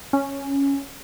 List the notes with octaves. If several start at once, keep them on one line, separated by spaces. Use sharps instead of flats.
C#4